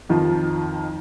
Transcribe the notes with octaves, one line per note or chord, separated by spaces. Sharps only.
F2 D#3 F3